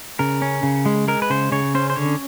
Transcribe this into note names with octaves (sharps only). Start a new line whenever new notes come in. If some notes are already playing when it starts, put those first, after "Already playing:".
C#3 A#4
C#4
C#3
G#3
G#3 A#4
B4
C#3 C5
C#3 C#5
C#4 C5
C5
D3 C#5